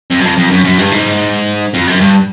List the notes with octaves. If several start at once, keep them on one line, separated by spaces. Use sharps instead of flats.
F2
F#2
F2
F2
F#2
F#2
G2
G#2
F2
F#2
G2